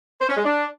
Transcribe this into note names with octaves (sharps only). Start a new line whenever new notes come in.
C5
C#4
G#3
D4